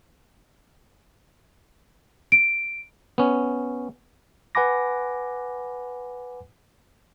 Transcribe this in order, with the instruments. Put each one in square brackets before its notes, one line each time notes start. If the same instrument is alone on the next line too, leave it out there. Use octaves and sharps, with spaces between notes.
[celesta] D7
[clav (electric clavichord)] B3 C#4
[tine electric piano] B4 F#5 G#5 B5 D6 A#6